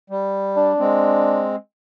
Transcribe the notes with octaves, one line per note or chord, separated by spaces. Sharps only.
G3
D4
G#3 C4